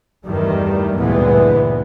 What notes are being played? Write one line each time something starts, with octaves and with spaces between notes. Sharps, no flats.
E2 G2 D#3 G3 A3
D2 G2 A#2 E3 G#3 B3